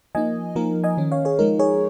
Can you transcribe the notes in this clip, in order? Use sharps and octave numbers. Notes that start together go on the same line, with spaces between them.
F3 A#3 D#4 D#5 G#5
F3 A#3 D#4 A#4
D#5 G#5
D#3 C#4
C#5 F5
G#4 C#5
F3 G#3 D#4 A#4
G#4 C#5